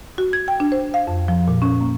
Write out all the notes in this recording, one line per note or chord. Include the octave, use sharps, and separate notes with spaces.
F#4
G#6
G5
D4
C5
F5
F2
F3
A#2
C#4
A#3